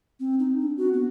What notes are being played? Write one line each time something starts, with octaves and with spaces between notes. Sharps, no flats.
C4
D#4
D4
F#4
B3